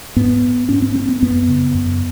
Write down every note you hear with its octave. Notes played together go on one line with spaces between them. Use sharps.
G#2 B3
G#2 C#4
C4
C4
B3
F#2 B3
C#3
F#2